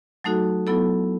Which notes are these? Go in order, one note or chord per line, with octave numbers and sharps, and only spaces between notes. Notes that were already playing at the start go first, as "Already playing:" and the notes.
F#3 A3 D#4 F#4 A4
F#3 B3 E4 A4